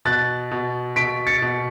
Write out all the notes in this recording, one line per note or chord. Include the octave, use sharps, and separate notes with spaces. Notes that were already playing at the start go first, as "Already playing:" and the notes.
B2 F#6 A6
B2
B2 B6 D7
A6 C#7
B2